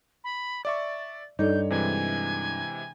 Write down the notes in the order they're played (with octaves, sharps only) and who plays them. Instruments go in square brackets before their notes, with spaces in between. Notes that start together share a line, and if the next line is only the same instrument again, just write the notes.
[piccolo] B5
[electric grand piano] D5 E5 C#6 [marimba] D6 [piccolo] A6
[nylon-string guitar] G2 D#4 [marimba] D4 A4 D5 [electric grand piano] C#5 [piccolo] G6
[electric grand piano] C3 E3 G#3 [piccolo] G#5